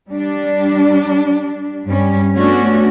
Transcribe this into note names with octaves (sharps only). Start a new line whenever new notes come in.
G3 D4
G2 G3 C#4
A3 B3 C#4 D4 F#4